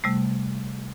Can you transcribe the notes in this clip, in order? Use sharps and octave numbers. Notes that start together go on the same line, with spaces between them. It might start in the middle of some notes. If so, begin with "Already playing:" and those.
C3 G3 A3